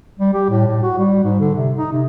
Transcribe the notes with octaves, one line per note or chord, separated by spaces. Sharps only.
G3
G4
A2
A2
F#4
G3
G#2
D3
C3
D#4
C3